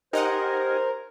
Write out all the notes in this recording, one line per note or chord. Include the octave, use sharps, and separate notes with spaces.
D#4 G4 A#4 C5 D#5 F#5 G#5